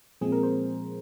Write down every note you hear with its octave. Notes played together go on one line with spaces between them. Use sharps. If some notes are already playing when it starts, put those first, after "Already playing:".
A#2 F3 G#3 C4 G#4
A#4
C5